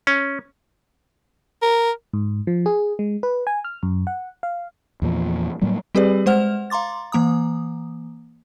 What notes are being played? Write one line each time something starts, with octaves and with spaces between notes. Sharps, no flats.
C#4
A#4
G#2
F3
G#4
G#3
B4
G#5
F6
F#2
F#5
F5
E2 A#2 F3
A2 F#3 G3 A#3
G3 C4 G4 G#4 B4 D5
G#3 C5 F#5 F6 F7
F5 A#5 C6 D6 A6
E3 A#3 A#5 D#6